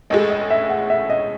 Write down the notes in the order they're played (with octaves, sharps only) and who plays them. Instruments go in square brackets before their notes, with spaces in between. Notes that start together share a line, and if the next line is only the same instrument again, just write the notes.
[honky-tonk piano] A1 A2 G#3 [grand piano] D#5
[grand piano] D#5
E5
F#5
E5
D#5